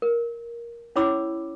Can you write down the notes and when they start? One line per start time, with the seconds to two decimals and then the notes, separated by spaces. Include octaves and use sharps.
0.02 A#4
0.96 C#4 E4 C#5 B5 D6 E6